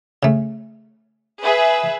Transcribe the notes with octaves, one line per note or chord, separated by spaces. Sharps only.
C#3 A3
G#4 B4 E5